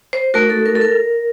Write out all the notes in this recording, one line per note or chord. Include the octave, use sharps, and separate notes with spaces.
C5
A3 D#4 F#4 A#4
A4
A#4
A4
A#4